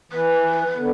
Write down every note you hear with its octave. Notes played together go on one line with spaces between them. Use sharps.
E3 B4
D3 B3